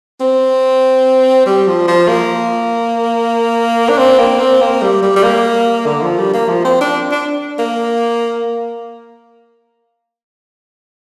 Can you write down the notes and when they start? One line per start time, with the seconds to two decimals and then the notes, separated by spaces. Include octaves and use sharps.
0.20 C4
1.46 G3
1.67 F3
1.87 F3
2.08 A#3
3.89 D4
3.98 C4
4.19 A#3
4.40 C4
4.61 A#3
4.82 G3
5.02 G3
5.16 G3
5.23 A#3
5.86 D3
6.02 F3
6.18 G3
6.34 A#3
6.49 F3
6.65 C4
6.81 D4
7.12 D4
7.59 A#3